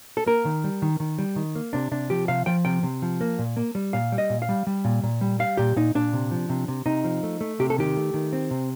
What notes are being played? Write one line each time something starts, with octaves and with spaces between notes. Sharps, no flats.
A4
A#3 A#4
D#3
G3
D#3
D#3
G3
D#3
A#3
C3 D4
C3 D4
F3 G4
C3 F5
F3 G5
C3 G5
C3
F3
A#3
A#2
A#3
G3
A#2 F5
G3
D#5
A#2
F5
G3
G3
A#2
A#2
G3
G3 F5
A#2 G4
A#2 D#4
A#2 D4
C3
F3
C3
C3
C3 D#4
F3
A3
A3
C3 G4
A4
D#3 G4
A3
D#3
C4
C3